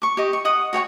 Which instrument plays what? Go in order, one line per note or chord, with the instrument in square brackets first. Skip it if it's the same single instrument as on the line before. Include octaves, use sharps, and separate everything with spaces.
[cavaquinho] C#6 D6
G4 D#5
C#6
D#5 F#5 D#6
F#4 C#5 G5 C#6